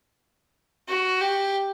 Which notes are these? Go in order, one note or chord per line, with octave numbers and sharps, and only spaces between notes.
F#4
G4